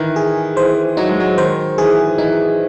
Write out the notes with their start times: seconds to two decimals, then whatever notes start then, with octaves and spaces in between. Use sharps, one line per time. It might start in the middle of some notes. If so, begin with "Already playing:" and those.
Already playing: D#3 E3
0.16 G#4
0.56 E3 C5
0.97 F#3 D#4
1.09 G#3
1.20 F#3
1.37 D#3 C5
1.78 E3 G#4
2.18 E3 D#4